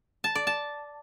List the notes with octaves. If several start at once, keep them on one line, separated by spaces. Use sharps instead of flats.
A5
D5
A5